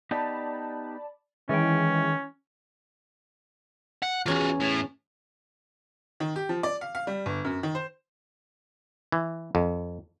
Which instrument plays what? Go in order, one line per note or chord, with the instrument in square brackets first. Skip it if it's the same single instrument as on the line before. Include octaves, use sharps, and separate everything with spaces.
[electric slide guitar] B3 D#4 G4 [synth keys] D5 A5 B5
[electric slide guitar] D#3 G5 [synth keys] E3 G#3 [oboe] C#4
[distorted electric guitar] F#5
[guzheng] E2 C#4 A#5 [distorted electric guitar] F4 F#4
[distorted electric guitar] A2
[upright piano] D#3
G4
F3
D5
F5
F5
G3
G1
F#2
D#3
C5
[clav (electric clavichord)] E3
F2